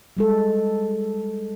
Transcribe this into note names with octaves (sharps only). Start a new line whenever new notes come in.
G3 G#3 A4